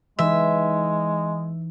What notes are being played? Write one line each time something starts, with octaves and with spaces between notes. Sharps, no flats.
E3 G#3 D#4 E5